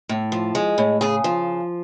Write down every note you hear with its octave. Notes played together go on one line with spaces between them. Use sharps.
A2
F3
G#3
A2
C#3 G#4
F3